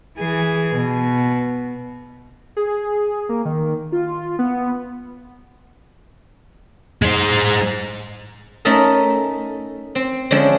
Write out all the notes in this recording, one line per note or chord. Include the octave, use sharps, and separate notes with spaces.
E3 G#4
B2
G#4
A#3
D#3
F4
B3
G#3 C5
A3 C#4 D#4 A4 A#4
C4
D3 F3 G#3 C#4 D4